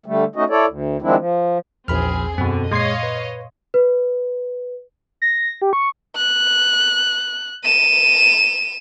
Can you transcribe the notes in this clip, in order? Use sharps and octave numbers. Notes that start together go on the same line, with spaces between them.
D3 G3 A3
A3 C#4 D#4 F#4 D#5
E4 A4 C#5 D5
D2
D#3 F3 G#3 C4 D4 E4
F3
A#1 E2 C4 G#4 B5 F6
F#2 B2 D3 C4
A#2 G#3 C#5 D#5 F5 C6 G#6 C7
B4
B4
A#6
G4
C#6
F#6
D#7 E7